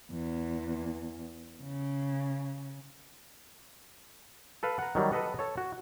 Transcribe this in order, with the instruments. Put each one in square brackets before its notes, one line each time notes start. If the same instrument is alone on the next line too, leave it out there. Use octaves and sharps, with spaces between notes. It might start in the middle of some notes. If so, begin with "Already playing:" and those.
[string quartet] E2
C#3
[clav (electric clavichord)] A4 B4 F5
F#5 A#5
D#3 F#3 G3
A4 B4 D#5 F#5
A4 C#5
F#4